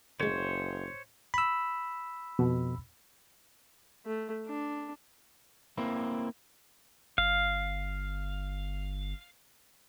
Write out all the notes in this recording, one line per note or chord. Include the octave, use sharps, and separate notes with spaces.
F#1 D3 G#3 C5 C#5
B5 E6
F2 B2
A3
D4
A#3 C4 E4
G1 F5